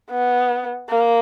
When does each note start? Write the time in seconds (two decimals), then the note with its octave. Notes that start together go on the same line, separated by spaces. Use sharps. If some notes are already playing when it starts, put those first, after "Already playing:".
0.10 B3
0.89 A#3